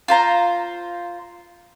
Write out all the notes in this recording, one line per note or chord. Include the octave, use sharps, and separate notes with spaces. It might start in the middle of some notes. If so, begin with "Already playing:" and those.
F4 C5 A#5